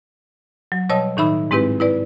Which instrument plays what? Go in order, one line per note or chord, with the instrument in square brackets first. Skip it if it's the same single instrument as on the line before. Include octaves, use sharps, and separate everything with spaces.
[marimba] F#3
B2 G3 C#5 D#5 A5 E6
A2 D#3 D#4 E5 B5 E6
G#2 G#3 C4 E4 G4 B4
E4 B4 D5